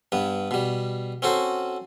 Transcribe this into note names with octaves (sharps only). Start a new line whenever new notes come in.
G2 B3
B2 G3
C4 C#4 F#4 A4 C5